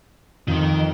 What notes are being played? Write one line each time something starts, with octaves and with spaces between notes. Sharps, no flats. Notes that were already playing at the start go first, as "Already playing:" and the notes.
F2 D#3